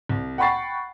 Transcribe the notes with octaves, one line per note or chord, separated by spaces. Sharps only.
C2
F#5 G5 B5 C#6 A6 C7